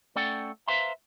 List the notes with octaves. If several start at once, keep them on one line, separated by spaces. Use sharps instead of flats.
A3 C#4 A4 D5 F#5 G5
B4 C5 E5 F5 A#5 C6